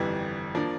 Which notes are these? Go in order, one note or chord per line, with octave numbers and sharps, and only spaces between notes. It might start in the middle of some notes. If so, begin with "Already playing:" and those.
Already playing: G1 F2 E3 G3
F3 A#3 D4